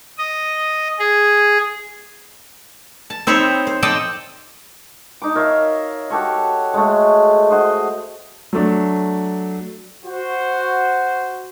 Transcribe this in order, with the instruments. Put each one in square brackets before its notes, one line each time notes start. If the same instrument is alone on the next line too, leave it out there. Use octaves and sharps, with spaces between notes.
[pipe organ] D#5
G#4
[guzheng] A5
C4 D#4 C5 C#5 E5 B5
C5
A4 C5 D5 D#5 G5 A5
[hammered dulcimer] D#4 D6
A#4 C#5 E5 F5
F#4 G4 A4 C#5
G#3 A3
F#4 C5 D#5
[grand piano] F#3 A3 D4
[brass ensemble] F#4 C5